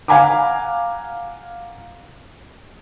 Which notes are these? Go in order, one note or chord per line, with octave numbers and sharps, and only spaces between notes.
F5 F#5 G#5 A#5 B5 D6